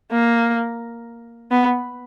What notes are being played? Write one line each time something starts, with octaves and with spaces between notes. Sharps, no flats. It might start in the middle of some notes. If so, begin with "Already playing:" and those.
A#3
B3